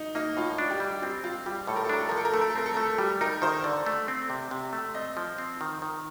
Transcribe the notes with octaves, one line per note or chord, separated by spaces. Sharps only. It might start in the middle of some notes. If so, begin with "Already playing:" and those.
Already playing: D#4
A#3 D#4
A2 F4
D4
G4
G3
C4 G4
C4 F4
G3 G4
A2 A4
A#4
A4
D4 A#4
A4
F3 A#4
A4
A#4
A3 A4
A#4
A4
C4 A#4
A4
A3 A#4
A4
G3 G4
D#4 A#4
D#3 C5
D3 D5
A3
C4
C3
C3
A3
C4 D#5
F3
C4
D#3
D#3